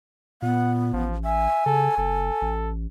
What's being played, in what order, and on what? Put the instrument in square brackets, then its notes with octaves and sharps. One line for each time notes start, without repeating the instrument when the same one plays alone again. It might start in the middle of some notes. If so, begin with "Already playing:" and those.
[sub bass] A#2 [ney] B3 [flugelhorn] F#5
[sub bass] A1 [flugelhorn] F3
[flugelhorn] E5 [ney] G#5
[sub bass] C#3 [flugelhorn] A4
[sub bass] F#1 [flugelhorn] A4
[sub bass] A1